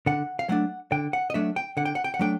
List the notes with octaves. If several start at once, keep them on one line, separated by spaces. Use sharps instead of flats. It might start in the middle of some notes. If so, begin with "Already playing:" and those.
D3 F#5
F5
F#3 A3 D4 F#5
D3 G5
F#5
D#5
F#3 A3 D4 E5
G5
D3 F#5
G5
F#5
G5
F#5
F#3 A3 D4 G5